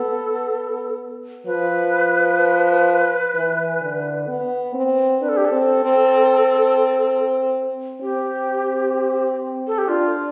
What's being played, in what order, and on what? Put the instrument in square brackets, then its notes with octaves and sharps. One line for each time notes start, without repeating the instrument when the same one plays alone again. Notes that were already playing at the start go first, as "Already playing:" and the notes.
Already playing: [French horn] B3 [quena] A4
[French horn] F3 [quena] B4
[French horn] E3
D3
B3
C4
[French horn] D4 [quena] B4
[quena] A4
G4
A4
[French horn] C4
C4
[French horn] C4 [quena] G4
[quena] A4
G4
[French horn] D4 [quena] F4